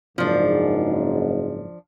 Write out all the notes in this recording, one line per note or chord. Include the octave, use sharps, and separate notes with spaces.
F#1 G#2 F3 D4